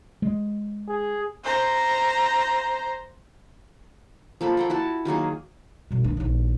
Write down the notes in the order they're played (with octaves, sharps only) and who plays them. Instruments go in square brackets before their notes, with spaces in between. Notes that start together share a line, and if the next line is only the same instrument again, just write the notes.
[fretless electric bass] G#3
[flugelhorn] G#4
[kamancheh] C5 A#5
[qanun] F3 A#3 A4 B5
A#3 F#5 G5
E4 F#4 A5
D#3 F#3 A#3 G#4
[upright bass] B2 G3
D#3 D4
A#1 D#2